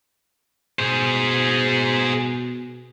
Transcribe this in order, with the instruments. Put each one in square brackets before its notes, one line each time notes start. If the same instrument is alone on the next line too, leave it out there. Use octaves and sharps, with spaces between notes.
[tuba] B2 [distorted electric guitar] G#4 C5